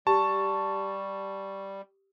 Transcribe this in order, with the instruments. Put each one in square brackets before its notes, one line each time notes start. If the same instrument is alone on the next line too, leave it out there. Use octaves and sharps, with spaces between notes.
[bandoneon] G3 [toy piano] G4 [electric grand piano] A5 [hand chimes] C#6